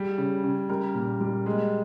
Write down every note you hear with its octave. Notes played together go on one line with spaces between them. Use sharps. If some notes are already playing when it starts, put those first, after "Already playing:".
Already playing: G3 G#4
C#3
C#3
G3 A#4
A#2
G3
G#3